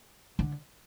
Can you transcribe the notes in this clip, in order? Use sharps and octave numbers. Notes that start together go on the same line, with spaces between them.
D3